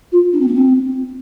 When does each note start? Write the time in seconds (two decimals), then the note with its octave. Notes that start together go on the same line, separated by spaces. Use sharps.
0.12 F4
0.32 D4
0.40 C4
0.47 A#3
0.54 C4